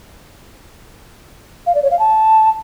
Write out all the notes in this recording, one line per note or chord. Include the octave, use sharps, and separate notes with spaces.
F5
D5
C#5
F5
A5